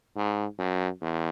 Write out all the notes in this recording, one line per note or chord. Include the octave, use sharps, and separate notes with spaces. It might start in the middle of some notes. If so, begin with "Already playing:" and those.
G#2
F#2
E2